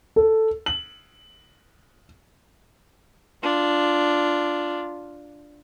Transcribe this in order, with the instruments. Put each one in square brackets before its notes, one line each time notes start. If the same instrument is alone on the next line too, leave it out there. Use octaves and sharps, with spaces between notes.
[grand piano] A4
F#7
[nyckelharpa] D4 F4